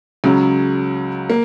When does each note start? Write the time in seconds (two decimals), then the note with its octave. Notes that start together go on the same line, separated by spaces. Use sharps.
0.24 C#2 C#3 F#3
1.30 A#3